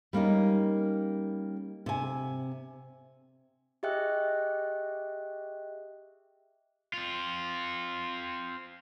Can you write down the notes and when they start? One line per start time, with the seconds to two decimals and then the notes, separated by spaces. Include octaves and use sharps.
0.13 G3 A#3 C#4 D#4
1.86 C3 G#5
3.83 G4 G#4 D#5 E5 G5 F#6
6.93 C4 F4